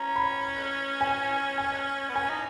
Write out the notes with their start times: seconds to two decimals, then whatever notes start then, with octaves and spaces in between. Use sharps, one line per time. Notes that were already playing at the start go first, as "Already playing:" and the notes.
Already playing: C#4 A#5
0.16 B5
1.01 G#5
1.58 G#5
2.09 B3
2.15 C#4 G#5
2.29 D#4